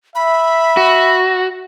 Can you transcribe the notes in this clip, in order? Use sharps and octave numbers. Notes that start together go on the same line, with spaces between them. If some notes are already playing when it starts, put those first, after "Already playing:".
E5 B5
F#4